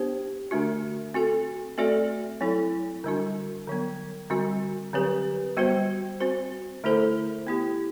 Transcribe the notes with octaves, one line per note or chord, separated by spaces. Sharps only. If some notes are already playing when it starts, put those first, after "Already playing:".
Already playing: B3 D4 G4 C5
D3 A3 D4 F#4
C4 F#4 A4
A3 C4 F#4 A4 D5
F#3 C4 E4 A4
D3 G3 D4 F#4
D3 F#3 B3
D3 G3 C4 F#4
D3 F#3 C4 G4 B4
G3 B3 F#4 C5
C4 F#4 C5
D3 A3 E4 A4 C5
B3 E4 G4